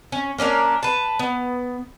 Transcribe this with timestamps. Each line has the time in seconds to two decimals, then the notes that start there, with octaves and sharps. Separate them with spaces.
0.12 C#4
0.38 A#3 C#4 D4 A#4
0.83 B4 A5
1.19 B3